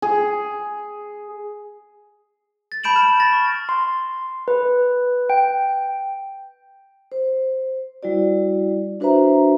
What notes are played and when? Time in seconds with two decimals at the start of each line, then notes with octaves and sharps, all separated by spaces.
0.02 G#4
2.72 A6
2.84 A5 B5 G6 D7 E7 F#7
2.96 F6 E7
3.20 B5 A6 A#6
3.33 C#6
3.69 C6
4.48 B4
5.30 G5
7.12 C5
8.03 G3 E4 F#4 D5
9.00 D4 F#4 B4 C5 E5 A#5